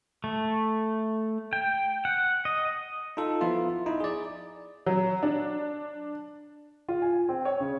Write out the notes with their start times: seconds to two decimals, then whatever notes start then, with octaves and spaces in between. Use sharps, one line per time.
0.24 A3
1.53 G5
2.05 F#5
2.45 D#5
3.17 D#4 F4 A4
3.41 F3 B3 E4 F4 E5
3.86 D#4 E4 D#5
4.00 G#4 D5
4.86 F#3
5.23 D4
6.89 F4
7.02 G#5
7.29 C4
7.45 C#5
7.60 C#3